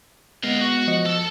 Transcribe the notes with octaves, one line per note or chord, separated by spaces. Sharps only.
G#3 B3 D#5 F5
F#4
F3 D#5 C#7
A4